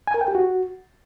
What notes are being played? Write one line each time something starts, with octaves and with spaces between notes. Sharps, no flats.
G#5
A#4
G5
G4
F#4